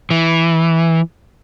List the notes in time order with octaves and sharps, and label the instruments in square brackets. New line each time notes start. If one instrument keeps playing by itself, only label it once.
[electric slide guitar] E3